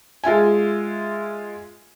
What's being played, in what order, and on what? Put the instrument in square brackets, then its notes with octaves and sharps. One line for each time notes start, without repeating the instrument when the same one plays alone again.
[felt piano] G#3 F4 E5 G#5